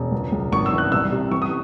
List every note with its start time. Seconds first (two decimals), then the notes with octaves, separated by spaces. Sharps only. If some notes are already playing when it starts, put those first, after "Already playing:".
Already playing: E1
0.12 C#2
0.32 C#2
0.52 G#1 C#6
0.66 E6
0.73 E3
0.78 F#6
0.92 C2 E6
1.12 C3
1.31 E3 C#6
1.42 D#6